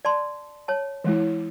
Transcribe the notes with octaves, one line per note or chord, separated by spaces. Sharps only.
D5 A5 C6
C#5 A5
E3 G#3 E4